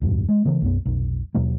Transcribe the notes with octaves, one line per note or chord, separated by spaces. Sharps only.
D1 E2 G2 B2
G#3
C#3 E3 A#3
B1 F#2 B3
F1 B1
D#2 B2 F#3 A#3